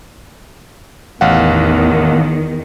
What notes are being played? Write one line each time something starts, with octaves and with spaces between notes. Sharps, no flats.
A1 E2 D#3 F5 F#5